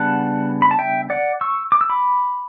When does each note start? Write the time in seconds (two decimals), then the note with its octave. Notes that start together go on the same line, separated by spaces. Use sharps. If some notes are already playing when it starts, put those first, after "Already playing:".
Already playing: C#3 G3 B3 D4 F#5 A5
0.62 B5
0.71 A5
0.79 E5 G5
1.10 D5 F#5
1.41 C#6 E6
1.72 D6
1.81 E6
1.90 B5 D6